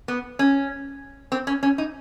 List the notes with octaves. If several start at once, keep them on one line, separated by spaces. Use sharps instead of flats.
B3
C#4
C4
C#4
C#4
D#4